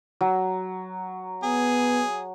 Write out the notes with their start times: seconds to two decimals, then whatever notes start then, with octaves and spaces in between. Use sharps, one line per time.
0.21 F#3
1.43 B3 G#4